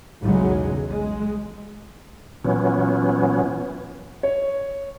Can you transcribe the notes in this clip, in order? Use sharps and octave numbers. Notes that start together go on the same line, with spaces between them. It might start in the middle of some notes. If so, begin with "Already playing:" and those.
B1 E2 C#3 F#3 G#3
G#3
A#2 E3 F#3 B3 C#4
C#5